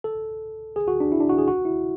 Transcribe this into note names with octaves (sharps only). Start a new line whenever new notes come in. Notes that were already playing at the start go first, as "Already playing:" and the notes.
A4
G#4
F#4
D4
E4
D4
F#4
G#4
F#4
E4